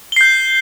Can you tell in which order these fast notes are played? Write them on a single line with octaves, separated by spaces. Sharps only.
G7 C7 G6